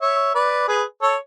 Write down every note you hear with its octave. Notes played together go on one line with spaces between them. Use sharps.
C#5 E5
B4 D5
G#4 B4
A4 C#5